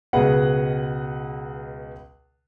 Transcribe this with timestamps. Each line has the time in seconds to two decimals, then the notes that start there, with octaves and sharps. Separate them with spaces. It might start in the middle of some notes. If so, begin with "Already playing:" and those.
0.13 C#2 B2 G#3 B4 F#5